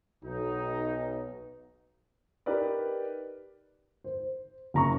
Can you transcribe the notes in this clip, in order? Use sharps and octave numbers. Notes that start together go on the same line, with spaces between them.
B1 D#4
D#4 G4 A#4 B4 D5
C5
F#1 A#5 C#6